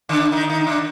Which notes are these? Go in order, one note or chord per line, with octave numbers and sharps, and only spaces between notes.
D3 D4
D#3 D#4
D#3 D#4
D#4
D3 D4